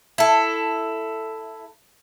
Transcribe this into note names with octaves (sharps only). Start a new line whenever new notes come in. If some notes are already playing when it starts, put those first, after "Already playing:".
E4 A4